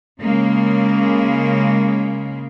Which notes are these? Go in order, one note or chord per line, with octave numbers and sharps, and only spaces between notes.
C#3 G#3 A#3